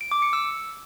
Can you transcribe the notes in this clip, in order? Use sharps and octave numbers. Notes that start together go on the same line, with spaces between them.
D7
D6
C#7
E6